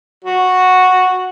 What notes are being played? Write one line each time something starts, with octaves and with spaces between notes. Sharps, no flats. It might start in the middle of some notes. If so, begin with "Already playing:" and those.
F#4